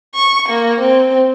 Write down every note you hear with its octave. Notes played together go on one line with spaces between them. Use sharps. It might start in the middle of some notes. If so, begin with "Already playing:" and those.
C#6
A#3
C4